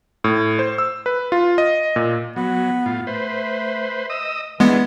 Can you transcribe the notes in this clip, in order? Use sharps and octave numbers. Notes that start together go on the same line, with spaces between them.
A2
C5
E6
B4
F4
D#5
A#2
F#3 B3
A2 F4
A3 B4 C5
D#5 D#6 E6
E3 G#3 B3 D4 E4 G#4